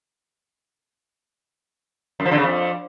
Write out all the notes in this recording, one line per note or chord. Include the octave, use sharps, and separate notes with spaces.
F#2
F3
D3
C#3
F2